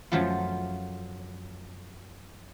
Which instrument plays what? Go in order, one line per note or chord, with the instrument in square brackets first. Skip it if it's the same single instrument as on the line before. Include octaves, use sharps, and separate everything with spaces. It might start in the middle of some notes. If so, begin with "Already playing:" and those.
[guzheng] F#2 F3 F#3 A3 F4